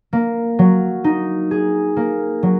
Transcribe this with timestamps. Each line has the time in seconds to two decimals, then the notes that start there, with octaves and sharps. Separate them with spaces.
0.13 A#3
0.59 F#3
1.04 D#4
1.51 G#4
1.96 A#3
2.43 F#3